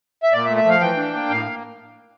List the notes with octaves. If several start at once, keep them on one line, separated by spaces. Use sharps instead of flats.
E5
A#2 D5
E5
A3
E5
F3 F5
E3 G5
D4
A#3
A2 F5
A#3